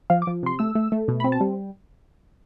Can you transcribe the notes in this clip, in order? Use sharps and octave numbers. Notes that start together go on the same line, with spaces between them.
F3 F5
D6
F3
C3 C6
A3 E6
A3
A3
B2
B5
C4
A5
G3